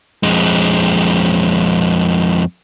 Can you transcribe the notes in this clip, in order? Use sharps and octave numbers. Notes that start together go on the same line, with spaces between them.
F2 G#3